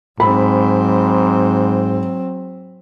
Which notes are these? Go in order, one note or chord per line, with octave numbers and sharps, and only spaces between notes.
G#2 F#3 C4 B5